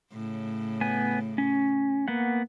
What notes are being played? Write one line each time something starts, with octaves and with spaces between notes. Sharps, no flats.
A2 C#3
B3 G#5
C#4
A#3 B3 F#5